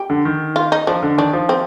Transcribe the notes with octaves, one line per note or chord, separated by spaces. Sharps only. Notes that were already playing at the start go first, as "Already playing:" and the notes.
Already playing: G4
D3
D#3
F4
D#4
F3 D4
D3
D#3 D4
F3
C4